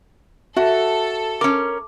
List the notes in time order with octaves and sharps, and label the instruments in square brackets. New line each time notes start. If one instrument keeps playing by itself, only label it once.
[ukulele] F#4 [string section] A4 [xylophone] E5
[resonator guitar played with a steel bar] C#4 A#4 [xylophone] D6